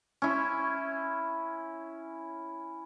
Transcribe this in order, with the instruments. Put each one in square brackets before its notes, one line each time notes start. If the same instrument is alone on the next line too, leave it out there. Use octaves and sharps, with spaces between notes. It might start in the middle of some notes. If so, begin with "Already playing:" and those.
[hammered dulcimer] C#4 E4